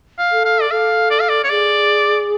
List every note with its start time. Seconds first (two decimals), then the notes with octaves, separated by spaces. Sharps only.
0.19 F5
0.32 A4
0.45 F5
0.61 D5
0.71 A4 F5
1.10 D5
1.20 F5
1.29 D5
1.44 C#5
1.50 G#4 D5